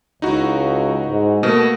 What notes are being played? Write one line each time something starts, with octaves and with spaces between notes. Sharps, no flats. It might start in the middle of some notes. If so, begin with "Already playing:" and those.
C#2 D#4 E4 F#4
G#2
B2 A3 A#3